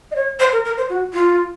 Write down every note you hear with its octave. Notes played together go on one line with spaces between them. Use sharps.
D#5
C#5
C5
A#4
A#4
C5
F#4
F4